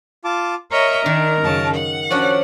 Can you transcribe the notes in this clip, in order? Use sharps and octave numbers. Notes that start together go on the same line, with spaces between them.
F4 A5 D6
A#4 C#5 D#5 E5 A#5
D#3 D4
F#2 C#3 A5
F#5
F3 C#4 D4 F#4